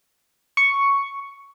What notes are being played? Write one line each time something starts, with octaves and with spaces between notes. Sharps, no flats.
C#6